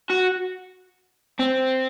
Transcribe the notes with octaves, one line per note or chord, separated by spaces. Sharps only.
F#4
C4